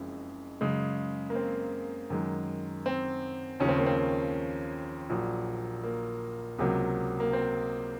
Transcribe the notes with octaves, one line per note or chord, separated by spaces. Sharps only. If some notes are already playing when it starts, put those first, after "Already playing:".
Already playing: F#1 F2 C#3 G#3
F#2 C#3 G#3
A#3
C4
F#2 D#3 G#3
C4
D#2 C#3 F3 C#4
C4
A#3
C4
A#1 A#2 F#3
A#3
C#2 C3 F#3 A#3
A#3
C4